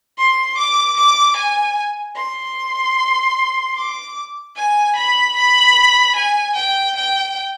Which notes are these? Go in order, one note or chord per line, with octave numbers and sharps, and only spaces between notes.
C6
D6
D6
G#5
C6
D6
G#5
B5
B5
G#5
G5
G5